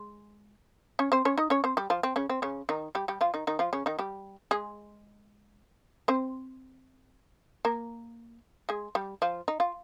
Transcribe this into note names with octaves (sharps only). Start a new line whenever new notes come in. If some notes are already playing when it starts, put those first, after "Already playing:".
Already playing: G#3
C#4 C#5
C4 C5
C#4 C#5
D#4 D#5
C#4 C#5
C4 C5
G3 G4
F3 F4
C4
C#3 C#4
C4
C#3 C#4
D#3 D#4
G3 G4
G3 G4
F3 F4
D#3 D#4
D#3 D#4
F3 F4
C#3 C#4
D#3 D#4
G3 G4
G#3 G#4
C4 C5
A#3 A#4
G#3 G#4
G3 G4
F3 F4
D#4
F4